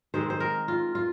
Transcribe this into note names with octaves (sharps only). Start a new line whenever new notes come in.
D#3 G#3 C4 C5
C5
A#4
F4
F4